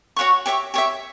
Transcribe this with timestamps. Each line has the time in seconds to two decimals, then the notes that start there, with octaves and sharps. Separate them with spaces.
0.17 F#4 C#5 F#5 C#6
0.46 G4 C#5 E5
0.74 G4 C#5 E5